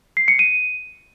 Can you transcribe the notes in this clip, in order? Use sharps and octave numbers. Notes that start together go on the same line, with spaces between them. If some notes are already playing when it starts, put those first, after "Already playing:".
C7
C#7
D#7